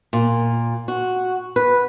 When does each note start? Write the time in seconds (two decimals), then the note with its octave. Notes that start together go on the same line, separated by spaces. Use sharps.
0.13 A#2
0.88 F#4
1.56 B4